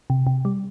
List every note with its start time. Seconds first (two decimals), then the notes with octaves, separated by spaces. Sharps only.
0.10 C3
0.27 C3
0.45 G3